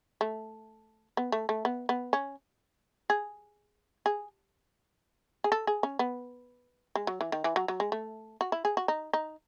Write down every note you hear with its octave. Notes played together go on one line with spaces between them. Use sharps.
A3
B3
A3
A3
B3
B3
C#4
G#4
G#4
G#4
A4
G#4
C#4
B3
G#3
F#3
E3
D#3
E3
F#3
F#3
G#3
A3
F#4
E4
G#4
F#4
D#4
D#4